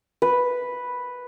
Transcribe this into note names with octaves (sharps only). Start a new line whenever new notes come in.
B4